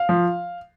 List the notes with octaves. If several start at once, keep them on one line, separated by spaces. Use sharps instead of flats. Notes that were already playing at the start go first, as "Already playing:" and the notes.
Already playing: F5
F3